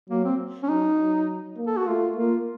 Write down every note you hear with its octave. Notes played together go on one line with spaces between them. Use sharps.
F#3 A#3
C4
C#4
F#3 D#4
F#3
A#3
A4
F#4
A3 F4
A#3 F4